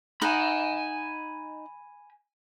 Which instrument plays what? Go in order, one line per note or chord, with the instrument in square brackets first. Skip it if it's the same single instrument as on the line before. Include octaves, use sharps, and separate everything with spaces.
[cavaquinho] D#4 D#5 F#5 [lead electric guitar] G#5 B5